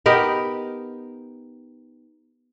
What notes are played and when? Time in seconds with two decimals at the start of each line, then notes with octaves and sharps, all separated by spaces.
0.06 B3 D#4 G4 A#4